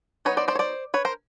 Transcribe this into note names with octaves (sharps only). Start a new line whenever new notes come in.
F#3 B3 D#4 B4 C#5
C5 D5
C5 D5
C#5
C5 D5
B4 C#5
A#4 C5